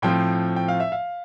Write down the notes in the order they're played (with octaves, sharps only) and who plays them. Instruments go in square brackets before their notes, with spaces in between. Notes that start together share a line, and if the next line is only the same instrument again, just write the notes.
[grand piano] A2 F3 C4 F4 G5
G5
F5
E5
F5